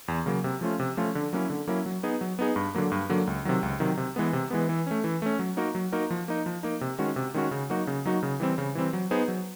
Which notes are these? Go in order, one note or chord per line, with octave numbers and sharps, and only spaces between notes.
E2
C#3 F#3 A#3
C3
F3 A3 C#4 F4
C3
F3 A3 C#4 F4
D3
F#3 A#3 C#4 E4
D3
F#3 A#3 C#4 E4
F#3
B3 D#4 G#4
F#3
B3 D#4 G#4
G2
D3 F#3 A#3
G2
D3 F#3 A#3
C#2
C3 D#3 F#3
C#2
C3 D#3 F#3
C3
E3 G#3 B3
C3
E3 G#3 B3
E3
A3 C#4
E3
A3 C#4
F#3
A#3 D#4 F#4 A#4
F#3
A#3 D#4 F#4 A#4
F3
A#3 D#4
F3
A#3 D#4
C3
D#3 G#3 C#4 F#4
C3
D#3 G#3 C#4 F#4
C#3
F#3 A#3 D#4 F#4
C#3
F#3 A#3 D#4 F#4
C#3
E3 G3 C4
C#3
E3 G3 C4
F#3
B3 D#4 G#4 C5
F#3